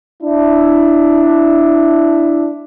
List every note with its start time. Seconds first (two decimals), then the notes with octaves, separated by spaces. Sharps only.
0.23 D4 E4